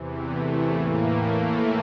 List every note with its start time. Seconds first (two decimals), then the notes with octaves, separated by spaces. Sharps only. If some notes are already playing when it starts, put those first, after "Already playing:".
Already playing: E2 C3 E3
0.29 A3
0.71 A2 E3 A#3
1.15 A3